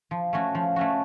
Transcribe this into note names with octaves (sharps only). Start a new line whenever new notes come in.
F3
A3 C#4 F#4
F3
A3 C#4 F#4